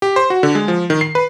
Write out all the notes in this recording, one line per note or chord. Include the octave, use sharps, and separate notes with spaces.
G4
C5
F#4
D3
G#3
F3
D#3
C7
B4